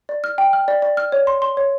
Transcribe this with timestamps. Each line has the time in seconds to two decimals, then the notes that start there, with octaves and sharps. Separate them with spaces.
0.09 D5
0.24 F6
0.38 G5
0.53 F6
0.68 D5
0.82 D5
0.97 F6
1.12 C#5
1.27 C6
1.42 C6
1.57 C#5